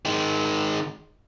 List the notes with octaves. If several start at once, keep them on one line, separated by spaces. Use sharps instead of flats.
D#3 G#3